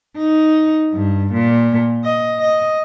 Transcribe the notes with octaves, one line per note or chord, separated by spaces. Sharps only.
D#4
G2
A#2
D#5
D#5